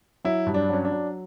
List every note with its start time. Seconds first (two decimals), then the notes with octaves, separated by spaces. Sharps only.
0.24 F#3 E4
0.46 G2
0.54 D4
0.69 F#3 C#4
0.85 D4
0.92 F#3